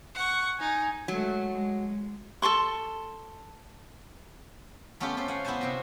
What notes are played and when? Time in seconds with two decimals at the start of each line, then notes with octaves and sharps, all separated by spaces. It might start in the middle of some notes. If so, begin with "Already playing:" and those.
0.15 F#5 C#6
0.60 D#4 G#5
1.08 F#3 G#3 A3
1.52 G#3
2.42 A4 A5 C6 C#6
5.00 A3 B3 C#4 F4 G4 A4
5.17 C#4 G4 A4 C5
5.28 F5 F#5 G#5
5.45 B3 E4 G4 C5 G#5 A5
5.61 C3 C4 F#4